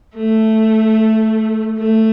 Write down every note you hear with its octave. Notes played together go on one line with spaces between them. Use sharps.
A3
A3